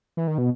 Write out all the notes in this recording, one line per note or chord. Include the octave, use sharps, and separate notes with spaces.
E3
D#3
B2